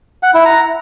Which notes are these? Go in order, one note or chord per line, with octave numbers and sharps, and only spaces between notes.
F#5
E4
A#5